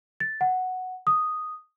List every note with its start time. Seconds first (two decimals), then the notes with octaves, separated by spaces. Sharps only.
0.20 A6
0.41 F#5
1.07 D#6